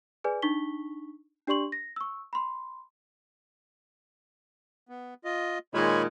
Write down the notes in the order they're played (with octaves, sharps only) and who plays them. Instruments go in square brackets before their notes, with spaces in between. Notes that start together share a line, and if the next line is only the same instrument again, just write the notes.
[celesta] G#4 B4 D5 G#5
D4 D#4 C#6 B6 G7
D4 G4 D5 C6 C#6 F#7
A#6
C#6 E6
B5 C6
[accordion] B3
F4 D#5
[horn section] A#2 D#3 G#3 [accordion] C#5 G#5 B5